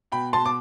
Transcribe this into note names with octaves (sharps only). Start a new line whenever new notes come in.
B2 G5 B5
B2 A5 C6
D6